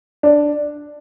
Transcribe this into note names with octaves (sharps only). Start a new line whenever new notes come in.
D4